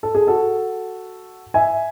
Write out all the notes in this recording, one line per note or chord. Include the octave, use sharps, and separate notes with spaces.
A4
G#4
F#4 A4
E5 G#5